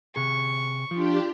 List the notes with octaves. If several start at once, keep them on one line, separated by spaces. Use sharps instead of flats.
C3 G#4 C#6
F3 D4 F4 G4